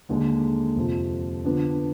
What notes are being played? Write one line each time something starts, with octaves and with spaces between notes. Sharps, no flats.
D#2 D3 G#3
F2 C3 F3
D3 F3 B3 D4